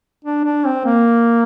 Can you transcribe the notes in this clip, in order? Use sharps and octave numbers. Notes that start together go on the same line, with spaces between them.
D4
D4
C4
A#3